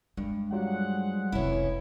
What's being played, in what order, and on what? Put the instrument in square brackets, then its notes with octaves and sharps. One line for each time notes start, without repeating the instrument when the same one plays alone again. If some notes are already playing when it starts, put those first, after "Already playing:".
[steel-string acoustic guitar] G2 [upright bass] G#3
[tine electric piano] F#3 G3 F4 [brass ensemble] G#4 C5 F#5
[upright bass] F1 C2 [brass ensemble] D#3 E3 [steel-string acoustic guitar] C#4 E4